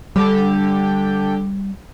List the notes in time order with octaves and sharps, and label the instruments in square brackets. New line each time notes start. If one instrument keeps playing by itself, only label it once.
[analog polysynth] D3 G4 [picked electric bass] G3